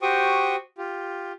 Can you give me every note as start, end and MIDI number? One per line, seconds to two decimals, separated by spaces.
0.02 0.56 66
0.02 0.56 67
0.02 0.56 72
0.02 0.56 79
0.02 0.56 85
0.02 0.56 87
0.78 1.32 65
0.78 1.32 67